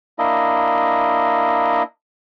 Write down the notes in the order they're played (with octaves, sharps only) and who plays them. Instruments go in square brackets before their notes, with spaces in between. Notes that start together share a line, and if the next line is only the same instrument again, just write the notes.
[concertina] A#3 D4 E4 D#5